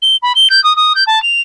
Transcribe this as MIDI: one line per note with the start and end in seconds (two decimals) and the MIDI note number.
0.02 0.16 103
0.22 0.33 83
0.35 0.48 103
0.50 0.62 91
0.64 0.75 87
0.76 0.93 87
0.95 1.04 91
1.07 1.22 81
1.22 1.41 101